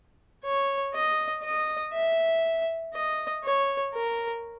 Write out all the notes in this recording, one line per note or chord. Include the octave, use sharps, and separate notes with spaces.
C#5
D#5
D#5
E5
D#5
C#5
A#4